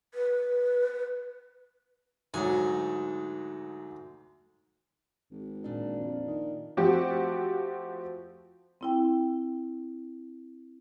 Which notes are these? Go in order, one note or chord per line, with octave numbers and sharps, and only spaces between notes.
B4
D2 G#2 F#3 D#4 G#5
G#1
A#2 D4
F2
D#3
F3 A3 C4 F#4 G4
C4 E4 G5